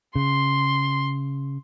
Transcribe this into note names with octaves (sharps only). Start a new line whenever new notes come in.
C#3 C6